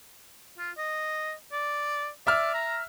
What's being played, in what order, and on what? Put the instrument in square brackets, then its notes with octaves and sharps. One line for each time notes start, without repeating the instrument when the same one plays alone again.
[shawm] F4
D#5
D5
[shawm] D5 [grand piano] E5 E6 F6
[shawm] A#5